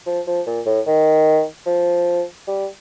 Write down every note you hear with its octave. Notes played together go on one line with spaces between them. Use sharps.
F3
F3
A#2
A2
D#3
F3
G3